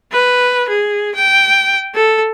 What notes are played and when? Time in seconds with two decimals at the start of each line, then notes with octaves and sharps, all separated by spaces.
0.12 B4
0.69 G#4
1.15 G5
1.95 A4